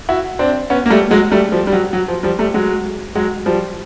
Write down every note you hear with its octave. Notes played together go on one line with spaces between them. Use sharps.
E4 F#4
C4 D4
B3 C#4
A#3
G3 A3
F#3 G#3
G3 A3
F3 G3
G3
F#3
F#3
F3
F3 G3
G3 A3
F#3 G#3
F#3 G#3
F3 G3